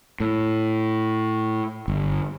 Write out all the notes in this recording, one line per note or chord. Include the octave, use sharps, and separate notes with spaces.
A2
G1